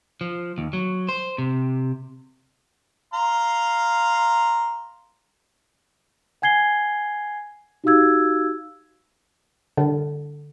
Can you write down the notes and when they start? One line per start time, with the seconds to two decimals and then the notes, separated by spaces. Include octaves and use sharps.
0.21 F3
0.58 D#2
0.73 F#3
1.09 C5
1.38 C3
3.14 F5 A#5 C6
6.42 F#5 G#5 G#6 C7 G7
7.84 D#4 F#4 G4 F5 E6 G#6
9.77 D3